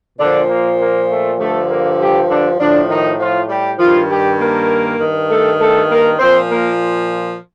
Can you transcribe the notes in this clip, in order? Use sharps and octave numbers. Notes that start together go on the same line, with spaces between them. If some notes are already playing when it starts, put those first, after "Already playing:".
A#2 D3 F3 D4
A#3
A#3
A3
G2 D3 F3 A3
A#3
G3 G4
D3 D4
A2 D3 F3 D4
D#3 D#4
F3 F4
G3 G4
G2 D#3 F3 F4
G3 G4
A#3 A#4
G2 D#3
A3 A4
A3 A4
A#3 A#4
A#2 F3 C4 C5
A#3 A#4